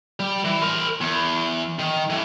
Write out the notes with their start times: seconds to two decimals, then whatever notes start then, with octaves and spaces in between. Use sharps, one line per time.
0.20 G3
0.45 E3
0.62 A#4 C5
1.01 E2
1.79 D#3
2.10 E3 A3